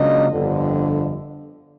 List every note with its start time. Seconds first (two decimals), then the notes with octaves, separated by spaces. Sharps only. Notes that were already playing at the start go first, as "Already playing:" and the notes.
Already playing: C#2 C#3 F#3 A#3 D4 D#5
0.30 G1 F2 D3